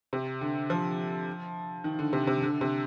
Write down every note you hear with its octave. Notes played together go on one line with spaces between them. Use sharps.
C3
D3
F3
D#3
D3
C3
C3
D3
C3